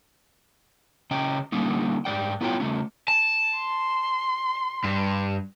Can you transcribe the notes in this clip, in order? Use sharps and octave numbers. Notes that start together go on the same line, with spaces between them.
C#3 C#4 D#5 G5
D3 G3 A#3 C#4 D#4
G#2 F3 D5 G5
B3 E4 F4 C#5 F5 G5
C#3 A3 C#4
A5
C6
G2